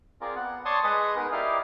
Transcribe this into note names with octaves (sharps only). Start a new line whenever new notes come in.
C4 F4 G#4 A#4 D5
B3 F#5
C#5 D5 A5 C6 C#6 D#6
G#3 G#4 B4 D#5 D#6
B3 D#4 G#4 A#4 B4
E4 G4 A#4 D5 D#5 F5